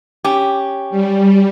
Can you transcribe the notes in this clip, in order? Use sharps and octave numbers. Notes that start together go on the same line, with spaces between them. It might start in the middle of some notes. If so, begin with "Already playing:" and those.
C#4 G4
G3